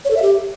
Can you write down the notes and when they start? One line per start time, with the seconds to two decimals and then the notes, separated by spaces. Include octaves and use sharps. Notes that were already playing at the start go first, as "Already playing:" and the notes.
0.05 C#5
0.10 A4
0.16 E5
0.22 G4